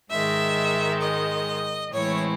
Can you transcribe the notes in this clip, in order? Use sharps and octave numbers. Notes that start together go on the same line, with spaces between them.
G#2 D#3 G#3 E5
D#5
A2 E3 G#3 C4 E4 C#5